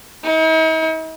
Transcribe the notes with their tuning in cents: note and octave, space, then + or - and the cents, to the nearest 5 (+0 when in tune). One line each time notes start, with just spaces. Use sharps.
D#4 +45